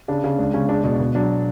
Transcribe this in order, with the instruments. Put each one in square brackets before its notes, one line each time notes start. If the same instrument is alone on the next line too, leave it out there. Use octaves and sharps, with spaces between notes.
[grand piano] C#3 D4
C#3
C#2 D4
C#3 C#4
G#3 D4
B2
B2
F#3 D4